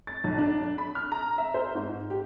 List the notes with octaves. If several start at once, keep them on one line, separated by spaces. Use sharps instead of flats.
A6
B1
D4
D4
B5
F6
A#5
E5
C5
G#2
G4